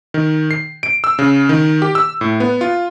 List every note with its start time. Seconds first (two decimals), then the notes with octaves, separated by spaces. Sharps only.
0.14 D#3
0.51 C7
0.83 D7
1.04 E6
1.19 C#3
1.49 D#3
1.82 G4
1.95 E6
2.21 A2
2.40 B3
2.61 F4